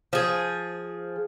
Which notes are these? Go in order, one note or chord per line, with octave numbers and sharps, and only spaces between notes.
F3 G#4